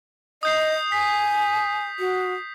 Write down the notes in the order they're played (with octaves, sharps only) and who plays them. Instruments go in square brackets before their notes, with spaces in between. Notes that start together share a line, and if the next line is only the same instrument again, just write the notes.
[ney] D#5 [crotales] D#6 G6 C7
[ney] G#5 [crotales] B6
[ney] F#4